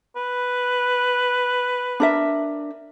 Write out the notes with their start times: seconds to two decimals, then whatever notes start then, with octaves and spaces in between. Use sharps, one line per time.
0.16 B4
2.00 D4 A#4 E5